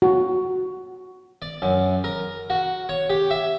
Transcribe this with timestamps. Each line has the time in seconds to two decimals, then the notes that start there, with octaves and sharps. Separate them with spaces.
0.02 F#4
1.42 D5
1.62 F#2
2.04 A#4
2.50 F#4
2.89 C#5
3.10 G4
3.31 E5